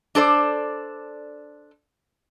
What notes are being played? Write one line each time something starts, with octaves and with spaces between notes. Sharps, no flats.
D4 A4 C5 D5